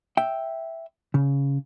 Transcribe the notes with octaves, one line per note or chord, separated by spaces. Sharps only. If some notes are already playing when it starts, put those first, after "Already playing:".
E5 G5
C#3